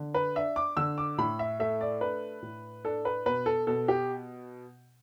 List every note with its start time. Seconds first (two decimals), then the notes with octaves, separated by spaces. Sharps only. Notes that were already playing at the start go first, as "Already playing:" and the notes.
Already playing: D3
0.14 B4
0.35 D4 E5
0.56 D6
0.77 D3 E6
0.98 D6
1.18 A2 B5
1.39 E5
1.60 A3 E5
1.81 D5
2.01 D4 B4
2.42 A2
2.85 D4 A4
3.05 B4
3.26 B2 B4
3.46 A4
3.67 B2 A4
3.88 G4